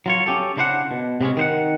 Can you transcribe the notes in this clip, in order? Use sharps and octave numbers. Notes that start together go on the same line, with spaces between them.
F#3 F4 C#5
C#4 G4 A4
C#3 D4 E4 C5 F5 F#5
B2
C3 G3 G#3 C#4
D#3 C5 F#5